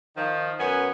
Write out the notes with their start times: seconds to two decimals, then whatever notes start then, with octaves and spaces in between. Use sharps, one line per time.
0.17 D#3 F3
0.60 F#2 B3 C#4 G#5